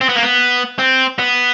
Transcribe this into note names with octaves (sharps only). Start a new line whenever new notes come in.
C4
B3
A#3
B3
C4
B3